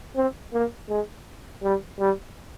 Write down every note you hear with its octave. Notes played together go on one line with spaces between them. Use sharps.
C4
A#3
G#3
G3
G3